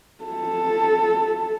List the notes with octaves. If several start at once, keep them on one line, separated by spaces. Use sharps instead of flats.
A4